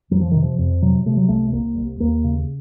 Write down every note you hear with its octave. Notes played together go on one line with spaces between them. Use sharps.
F2 F#3
F3
C3 D#3
F3
F2
C3 F#3
C3 A3
F#3
C2 A3
C2 A#3
C2
D#2 A#3
C#3